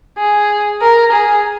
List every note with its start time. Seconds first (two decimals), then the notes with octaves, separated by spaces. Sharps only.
0.18 G#4
0.82 A#4
1.13 G#4